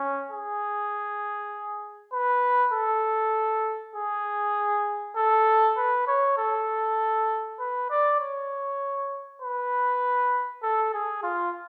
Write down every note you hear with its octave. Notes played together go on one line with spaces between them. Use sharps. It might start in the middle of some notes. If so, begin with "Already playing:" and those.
Already playing: C#4
G#4
B4
A4
G#4
A4
B4
C#5
A4
B4
D5
C#5
B4
A4
G#4
F4